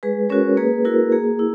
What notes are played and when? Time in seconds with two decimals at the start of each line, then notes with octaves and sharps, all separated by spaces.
0.03 G#3 G#4 B4
0.30 C#4 F#4 A#4 C#5
0.57 A#3 G#4 B4
0.85 E4 F#4 A#4
1.12 A#3 G#4
1.39 E4